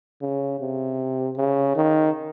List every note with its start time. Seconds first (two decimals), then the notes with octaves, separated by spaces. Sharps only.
0.22 C#3
0.60 C3
1.37 C#3
1.76 D#3